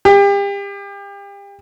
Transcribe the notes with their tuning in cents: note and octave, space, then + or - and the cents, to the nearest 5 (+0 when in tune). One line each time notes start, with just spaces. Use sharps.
G4 +35